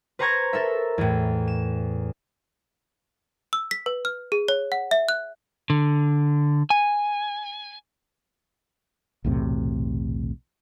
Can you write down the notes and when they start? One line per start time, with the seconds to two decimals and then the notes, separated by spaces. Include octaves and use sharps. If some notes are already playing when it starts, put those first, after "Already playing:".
0.19 B4 C5 A#5 C#6 G#6 A#6
0.53 A4 A#4 E5
0.98 E2 A2
1.48 E7
3.53 E6
3.71 B6
3.86 B4
4.05 F6
4.32 G#4
4.48 C#5
4.72 F#5
4.91 E5
5.09 F#6
5.70 D3
6.70 G#5
9.24 B1 E2 A2 C3